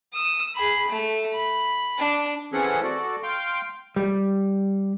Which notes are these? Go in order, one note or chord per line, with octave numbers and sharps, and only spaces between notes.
D#6 E6
G#4 B5
A3
B5
D4
E3 C4 C#4 G#4 A4 F#5
F#4 A4 D5
F5 G5 C6
G3